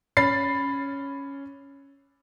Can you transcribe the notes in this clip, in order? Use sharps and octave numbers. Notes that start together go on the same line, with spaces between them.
C#4 B5 A6 C7